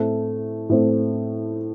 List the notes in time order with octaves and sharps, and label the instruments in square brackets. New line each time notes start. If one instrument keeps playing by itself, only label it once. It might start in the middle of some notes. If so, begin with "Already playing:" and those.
Already playing: [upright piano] A2 A3 C4
A2 A3 C4